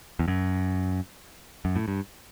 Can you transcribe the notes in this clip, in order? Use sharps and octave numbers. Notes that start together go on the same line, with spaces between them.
E2
F#2
F#2
A2
G2